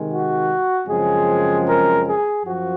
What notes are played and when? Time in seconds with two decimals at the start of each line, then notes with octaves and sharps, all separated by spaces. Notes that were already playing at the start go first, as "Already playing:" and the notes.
Already playing: C3 D#3 G#3
0.08 F#4
0.87 F#2 C#3 F3 G#3 C4 G#4
1.66 A#4
2.05 G#4
2.44 F#2 F3 F#4